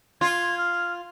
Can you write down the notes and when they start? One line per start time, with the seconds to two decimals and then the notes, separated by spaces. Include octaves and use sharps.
0.21 F4 G#6
0.58 F6